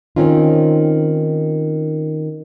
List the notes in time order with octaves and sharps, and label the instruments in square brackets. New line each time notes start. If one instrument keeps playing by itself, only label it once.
[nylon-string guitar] D#3 C4 C#4 D#4 F4